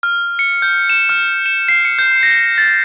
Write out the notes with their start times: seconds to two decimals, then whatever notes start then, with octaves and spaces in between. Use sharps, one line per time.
0.03 F6
0.39 C#7
0.62 G6
0.90 E7
1.09 F6
1.46 E7
1.69 C7
1.85 C#7
1.99 G6
2.23 A#6
2.58 A6